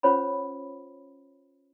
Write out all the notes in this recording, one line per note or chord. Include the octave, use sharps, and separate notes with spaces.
C#4 F4 C5 C#5 F#5 B5